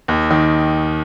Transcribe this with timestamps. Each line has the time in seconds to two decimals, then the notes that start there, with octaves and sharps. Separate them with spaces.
0.08 D#2
0.31 D#3